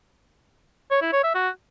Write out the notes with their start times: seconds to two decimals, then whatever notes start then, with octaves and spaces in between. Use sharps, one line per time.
0.91 C#5
1.02 E4
1.13 C#5
1.24 E5
1.35 F#4